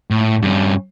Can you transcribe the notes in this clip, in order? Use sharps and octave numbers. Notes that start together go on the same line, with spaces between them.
A2
G2 C#4